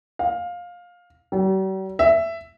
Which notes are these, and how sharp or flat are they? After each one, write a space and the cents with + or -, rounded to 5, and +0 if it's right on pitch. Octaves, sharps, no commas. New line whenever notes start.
F5 +15
G3 -45
E5 +10